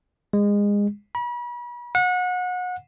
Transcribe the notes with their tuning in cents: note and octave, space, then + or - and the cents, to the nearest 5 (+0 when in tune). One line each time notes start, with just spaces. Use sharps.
G#3 -25
B5 -40
F#5 -30